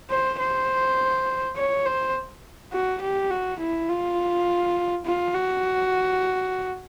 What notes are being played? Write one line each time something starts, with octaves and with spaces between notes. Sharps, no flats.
C5
C5
C#5
C5
F#4
G4
F#4
E4
F4
F4
F#4